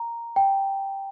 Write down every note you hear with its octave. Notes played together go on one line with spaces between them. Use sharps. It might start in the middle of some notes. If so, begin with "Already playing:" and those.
Already playing: A#5
G5